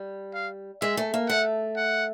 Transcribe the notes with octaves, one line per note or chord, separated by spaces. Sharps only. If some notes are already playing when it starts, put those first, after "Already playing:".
Already playing: G3
F5
G#3 E5
A3
A#3
A3 F#5
F#5